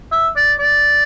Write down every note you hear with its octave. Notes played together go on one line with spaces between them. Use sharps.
E5
D5
D5